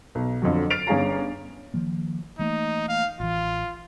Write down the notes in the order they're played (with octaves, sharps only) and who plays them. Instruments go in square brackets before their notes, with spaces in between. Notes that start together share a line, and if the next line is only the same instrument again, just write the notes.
[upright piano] B1
F2 D3 F#3
F6 A6 C7 D7 F7
G1 C#4 G#4 F5 A#5
[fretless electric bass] D#3 F3 A#3
[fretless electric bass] E3 A3 A#3 [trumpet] D#4
[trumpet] F5
[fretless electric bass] A1 E3 [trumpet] F4